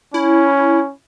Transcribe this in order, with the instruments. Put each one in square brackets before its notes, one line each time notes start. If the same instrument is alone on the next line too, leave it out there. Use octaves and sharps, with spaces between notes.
[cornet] C#4 [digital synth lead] E4